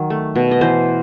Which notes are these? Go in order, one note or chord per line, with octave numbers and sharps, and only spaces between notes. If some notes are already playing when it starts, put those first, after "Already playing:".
Already playing: D#3 F#3
A3
B2
D#5
E3 C5